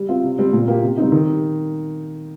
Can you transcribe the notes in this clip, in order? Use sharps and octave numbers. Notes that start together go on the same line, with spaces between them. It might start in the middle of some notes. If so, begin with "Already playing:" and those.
Already playing: G3
C4 F4
C3
G3 C4
A#2
A#3 G4
C3
G3 C4 D#4
D#3